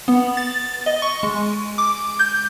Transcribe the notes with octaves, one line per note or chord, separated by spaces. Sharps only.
B3
A6
D#5
C#6
G#3
D6
G6